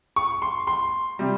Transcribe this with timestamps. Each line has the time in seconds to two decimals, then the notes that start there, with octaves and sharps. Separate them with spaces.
0.16 C#6
0.42 C6
0.67 C6
1.19 C3 G3